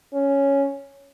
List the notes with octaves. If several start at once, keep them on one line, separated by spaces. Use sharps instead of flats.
C#4